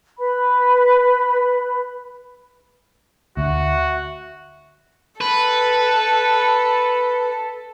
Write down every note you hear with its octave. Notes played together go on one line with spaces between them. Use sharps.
B4 B5
D2 F#4 E5
A4 B4